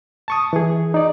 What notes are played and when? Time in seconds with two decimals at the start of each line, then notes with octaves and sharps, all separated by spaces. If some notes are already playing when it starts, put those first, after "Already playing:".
0.28 A5 C#6 D#6
0.53 E3 G#4
0.94 D#4 D5